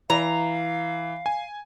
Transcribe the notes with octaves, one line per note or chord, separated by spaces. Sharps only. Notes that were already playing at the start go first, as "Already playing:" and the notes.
E3 F5 A#5
G#5